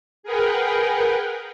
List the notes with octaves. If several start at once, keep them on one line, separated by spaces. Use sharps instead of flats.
G#4 A#4 B4 F#5 G5